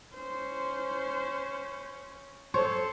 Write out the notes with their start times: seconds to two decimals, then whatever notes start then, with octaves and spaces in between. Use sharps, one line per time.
0.14 C#4 C5
2.54 A4 C5 C#5